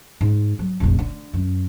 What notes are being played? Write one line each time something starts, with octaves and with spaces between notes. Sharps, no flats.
G#2
F#3
F1 A#1
D3
F#2